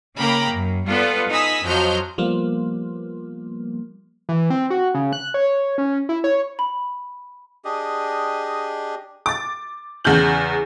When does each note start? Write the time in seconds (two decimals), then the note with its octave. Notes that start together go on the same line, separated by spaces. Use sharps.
0.17 C#3 A#3 G5 A#5 B5 D6
0.52 F#2
0.87 G3 B3 F4 A4 B4 D5
1.31 D#4 G#5 B5 D#6 E6 B6
1.64 F2 F3 F#3 D#5 F6 G6
2.18 F3 G3 A#3 B3
4.29 E3
4.50 C4
4.70 F#4
4.94 C#3
5.13 F#6
5.34 C#5
5.78 C#4
6.09 E4
6.24 C#5
6.59 B5
7.65 D4 G4 G#4 D#5
9.26 D6 A6
10.04 E2 C#3 F6 G6 F#7